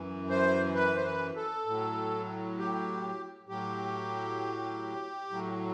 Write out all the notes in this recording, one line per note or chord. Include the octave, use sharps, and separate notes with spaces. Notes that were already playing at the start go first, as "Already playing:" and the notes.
Already playing: F#2 E3
C5
B4
C5
B4
A4
A2 F#3
G4
A2 F#3 G4
A2 F#3